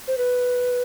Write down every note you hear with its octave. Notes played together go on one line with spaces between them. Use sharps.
C5
B4